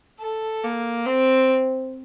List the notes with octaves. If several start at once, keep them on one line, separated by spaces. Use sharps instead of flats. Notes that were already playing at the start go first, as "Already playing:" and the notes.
A4
A#3
C4